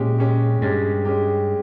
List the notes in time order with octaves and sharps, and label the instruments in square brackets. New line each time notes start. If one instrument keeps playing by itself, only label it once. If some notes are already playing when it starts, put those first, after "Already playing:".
Already playing: [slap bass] A#2 [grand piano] G#3 C#4 G4
[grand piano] G#3 C#4 G4
[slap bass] G2 [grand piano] G#3 C#4 G4
[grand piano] G#3 C#4 G4